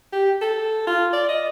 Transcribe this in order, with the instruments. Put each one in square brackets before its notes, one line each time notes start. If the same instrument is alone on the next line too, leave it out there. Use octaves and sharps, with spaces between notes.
[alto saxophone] G4
A4
F4
D5
D#5